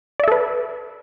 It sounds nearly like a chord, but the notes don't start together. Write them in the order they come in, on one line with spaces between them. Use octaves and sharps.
D5 E5 A4 B4